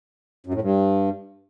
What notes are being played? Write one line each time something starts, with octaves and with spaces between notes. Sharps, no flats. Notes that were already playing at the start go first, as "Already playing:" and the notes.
F#2
A2
G2